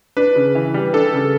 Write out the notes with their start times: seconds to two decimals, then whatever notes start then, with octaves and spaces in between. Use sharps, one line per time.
0.17 D4 B4
0.36 C#3
0.55 E3
0.74 G3
0.94 D4 A4
1.13 C#3